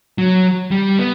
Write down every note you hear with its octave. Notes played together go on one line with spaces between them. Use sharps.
F#3
G3
B3